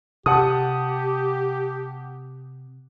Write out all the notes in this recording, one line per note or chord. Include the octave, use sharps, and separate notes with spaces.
C3 G4 F#5 A5 D#6